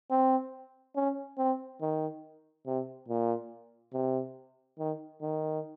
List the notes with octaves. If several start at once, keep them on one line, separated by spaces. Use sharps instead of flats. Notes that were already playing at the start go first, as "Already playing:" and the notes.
C4
C#4
C4
D#3
C3
A#2
C3
D#3
D#3